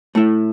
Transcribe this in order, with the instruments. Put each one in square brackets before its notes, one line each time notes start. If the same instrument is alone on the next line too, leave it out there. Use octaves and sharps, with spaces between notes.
[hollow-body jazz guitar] A2 A3 E4